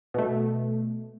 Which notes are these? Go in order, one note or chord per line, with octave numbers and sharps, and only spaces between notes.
B2 A3